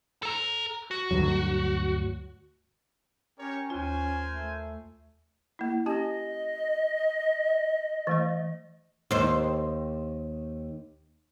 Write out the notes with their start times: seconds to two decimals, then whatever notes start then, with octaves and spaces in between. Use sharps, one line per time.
0.23 A4 A#5
0.91 F#4
1.11 D2 G2 F#3
3.39 C#4 G4 A#4 C#5
3.70 D#2 F4 A#4 C5 G#5
4.28 A3
5.59 A#3 E4
5.86 C#4 G4 D#5 G#5
8.07 E3 A3 C5
9.11 D#2 C5